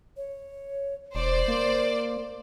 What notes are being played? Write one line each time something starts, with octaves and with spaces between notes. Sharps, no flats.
C#5
E1 C5 D5 C6
A#3 A#4